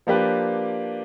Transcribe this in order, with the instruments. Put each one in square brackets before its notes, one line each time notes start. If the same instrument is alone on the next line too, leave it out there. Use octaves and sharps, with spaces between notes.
[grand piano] F3 A#3 D4 G4 B4